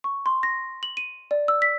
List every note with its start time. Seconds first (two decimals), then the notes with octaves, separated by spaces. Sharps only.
0.04 C#6
0.26 C6
0.43 A#6
0.83 F#7
0.97 D#7
1.31 D5
1.48 E6
1.62 B6